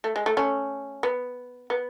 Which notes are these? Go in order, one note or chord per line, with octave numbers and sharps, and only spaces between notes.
A3
G#3
A3
A3 C#4
B3
B3